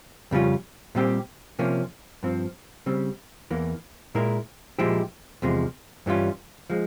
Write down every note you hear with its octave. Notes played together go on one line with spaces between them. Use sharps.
F2 C#3 G3 C#4 F4
A#2 G3 C4 G4
C3 F3 A#3 C#4
G2 F3 C4
C#3 G3 C4
E2 E3 A#3
A#2 G#3 E4 A#4
A#2 F3 G#3 E4 G4
E2 C3 F3 G#3
G2 E3 G3 C#4 F4
F3 G#3